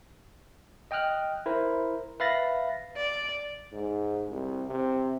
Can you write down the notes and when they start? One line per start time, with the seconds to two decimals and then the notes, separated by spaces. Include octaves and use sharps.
0.91 D#5 G5 D#6 F6 F#6
1.46 E4 A#4 C5
2.20 B4 E5 F5 B5 A6 A#6
2.97 D5
3.72 G#2
4.29 C2
4.67 C3